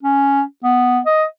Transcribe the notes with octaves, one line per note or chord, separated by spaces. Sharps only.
C#4
B3
D#5